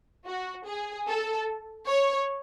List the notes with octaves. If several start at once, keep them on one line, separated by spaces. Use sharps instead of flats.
F#4
G#4
A4
C#5